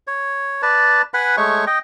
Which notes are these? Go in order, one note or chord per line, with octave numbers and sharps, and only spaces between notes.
C#5
B4 D5 A5
B4 F#5 G#5 B5
G#3 A3 C#5 C#6
D#5 G5